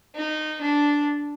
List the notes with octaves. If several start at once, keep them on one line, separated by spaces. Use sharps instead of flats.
D#4
D4